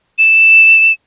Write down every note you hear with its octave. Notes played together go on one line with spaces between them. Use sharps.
E7